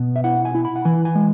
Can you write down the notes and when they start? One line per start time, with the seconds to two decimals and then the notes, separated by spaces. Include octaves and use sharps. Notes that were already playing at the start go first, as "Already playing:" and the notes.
Already playing: B2 B3
0.16 E5
0.24 E4 F#5
0.45 G#5
0.55 E4
0.65 B5
0.76 F#5
0.85 E3 G#5
1.05 G#5
1.15 G#3